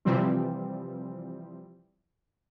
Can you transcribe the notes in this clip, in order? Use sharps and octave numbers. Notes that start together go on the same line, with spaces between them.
C3 E3 F3 G3 C4